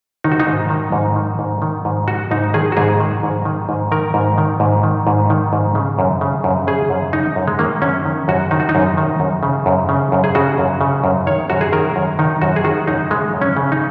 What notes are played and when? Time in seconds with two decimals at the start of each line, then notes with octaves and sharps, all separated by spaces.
0.24 D#3 D#4
0.32 F#4
0.40 D#4
0.47 G#2
0.70 D#3
0.92 G#2
1.16 D#3
1.39 G#2
1.62 D#3
1.85 G#2
2.08 D#3 F#4
2.31 G#2 D#4
2.54 D#3 G#4
2.72 F#4
2.77 G#2 G#4
3.00 D#3
3.23 G#2
3.45 D#3
3.69 G#2
3.92 D#3 A#4
4.14 G#2
4.38 D#3
4.60 G#2
4.83 D#3
5.07 G#2
5.30 D#3
5.53 G#2
5.75 C#3
5.99 F#2
6.21 C#3
6.44 F#2
6.67 C#3 G#4
6.90 F#2
7.13 C#3 D#4
7.36 F#2
7.48 G#3
7.59 D#3 A#3
7.82 F#2 C#4
8.06 D#3
8.28 F#2 F#4
8.51 D#3 D#4
8.60 F#4
8.69 D#4
8.75 F#2
8.97 D#3
9.20 F#2
9.43 C#3
9.66 F#2
9.89 C#3
10.12 F#2
10.24 G#4
10.35 C#3 F#4
10.58 F#2
10.81 C#3
11.04 F#2
11.27 D#3 C#5
11.50 F#2 F#4
11.61 G#4
11.73 D#3 A#4
11.96 F#2
12.19 D#3 D#4
12.42 F#2 F#4
12.56 G#4
12.64 D#3 F#4
12.87 F#2 D#4
13.10 C#3 G#3
13.34 F#2
13.42 C#4
13.57 C#3
13.72 D#4